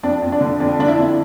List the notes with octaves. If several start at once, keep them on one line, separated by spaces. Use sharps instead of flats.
F2 D4
F2
D4
D3
F2 D4
D3 D4
E4
F2